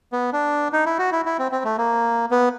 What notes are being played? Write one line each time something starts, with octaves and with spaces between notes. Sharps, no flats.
B3
D4
D#4
E4
F#4
E4
E4
C4
C4
A3
A#3
B3